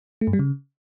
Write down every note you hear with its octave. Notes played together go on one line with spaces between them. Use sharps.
A3
G2
G3
C#3